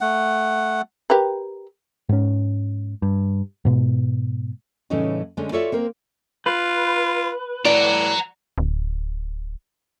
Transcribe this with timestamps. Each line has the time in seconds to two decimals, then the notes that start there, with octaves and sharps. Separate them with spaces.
0.01 A3 F#5
1.10 G4 A#4 B4
2.09 G#2 C#4
3.02 G2
3.65 G#2 B2
4.90 A2 C#3 E3 G3 C#4 D#4
5.37 D3 G#3 A3 C#4
5.52 F4 F#4 A4 C#5 D5 E5
5.72 A#3 C4 A#4
6.46 F4 B4
7.65 A2 D5 F#5 A#5
8.58 D1